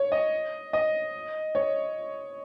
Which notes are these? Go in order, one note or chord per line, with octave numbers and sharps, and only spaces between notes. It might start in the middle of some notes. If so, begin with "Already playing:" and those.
Already playing: C#5
D#5
D#5
C#5